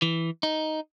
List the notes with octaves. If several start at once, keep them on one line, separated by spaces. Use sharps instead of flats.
E3
D#4